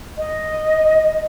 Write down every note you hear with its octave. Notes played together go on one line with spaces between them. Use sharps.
D#5